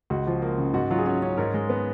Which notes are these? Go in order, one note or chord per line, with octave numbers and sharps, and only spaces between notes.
C#2 F#4
F3
A#3
C#3
G#2 F#4
F#3 F4
G#4
C#4 F#4
C#4
G#2 A#4
G#3
B3